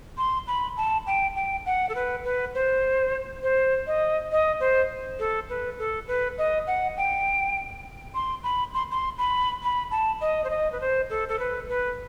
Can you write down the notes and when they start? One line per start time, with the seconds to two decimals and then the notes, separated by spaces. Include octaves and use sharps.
0.18 C6
0.47 B5
0.77 A5
1.07 G5
1.36 G5
1.66 F#5
1.89 A4
1.95 B4
2.25 B4
2.55 C5
3.43 C5
3.87 D#5
4.32 D#5
4.60 C5
5.19 A4
5.49 B4
5.79 A4
6.07 B4
6.38 D#5
6.67 F#5
6.97 G5
8.15 C6
8.44 B5
8.74 C6
8.91 C6
9.18 B5
9.62 B5
9.91 A5
10.21 D#5
10.44 C5
10.50 D#5
10.72 B4
10.81 C5
11.10 A4
11.28 A4
11.39 B4
11.69 B4